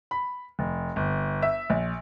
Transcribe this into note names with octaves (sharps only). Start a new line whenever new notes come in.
B5
F1
G1
E5
A#1